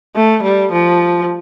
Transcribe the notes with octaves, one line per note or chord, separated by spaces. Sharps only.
A3
G3
F3